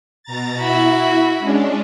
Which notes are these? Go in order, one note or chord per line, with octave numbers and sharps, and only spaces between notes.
B2 A#5 A6
E4 F#4 E5 B5
G#3 C#4 D4